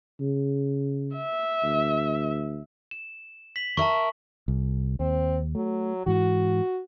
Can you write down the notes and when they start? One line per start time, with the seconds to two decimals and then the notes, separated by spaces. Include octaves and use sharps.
0.21 C#3
1.16 E5
1.63 D2
2.91 E7
3.56 B6 F#7
3.77 A#4 E5 A5 C#6
4.48 C2
5.00 D#2 C4
5.55 F#3 A3
6.06 G#2 E3 F#4